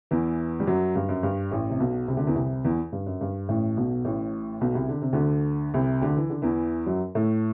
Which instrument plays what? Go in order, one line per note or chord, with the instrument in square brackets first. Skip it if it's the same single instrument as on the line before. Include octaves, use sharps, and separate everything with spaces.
[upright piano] E2 E3
G3
F#2 F#3
G2
F#2
G2
A1 A2
C3
B1 B2
C2 C3
D2 D3
E2 E3
C2 C3
E2 E3
G2
F#2
G2
A1 A2
B1 B2
A1 A2
B1 B2
C2 C3
D3
C3
D2 D3
C2 C3
D2 D3
E3
D3
E2 E3
F#2 F#3
A2 A3